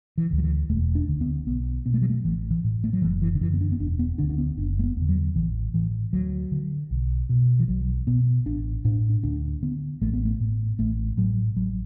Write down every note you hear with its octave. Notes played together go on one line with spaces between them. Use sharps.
E3
D2 D3
F#3
E3
E1 A3
D4
D2 D3
B3
B1 B3
B2 B3
A3
F#3
A3
A1 E3
E3
A2
A3
F#3
F#1 E3
E3
D3
F#2 D3 E3
B3
D4
B3
E1 D4
B3
D2 D3 D4
D4
B3
F#1 D4
A3
B3
E2 D3
F#3
A1 E3
A2 E3
D2 F#3
D3
B1
B2
E3
B1 F#3
B2 B3
A1 D4
A2 D4
D4
D2 D4
D3 B3
A1 A3
B3
A3
A2
A1 A3
A2 F#3
A1 F#3